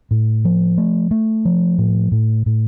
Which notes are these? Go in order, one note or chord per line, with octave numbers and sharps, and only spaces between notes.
A2
F3
A3
A3
F3
A2
A2
A2